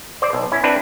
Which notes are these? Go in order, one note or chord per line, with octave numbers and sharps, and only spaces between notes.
C5 D5
B1
C#4 E4
C4 D4 E4 B4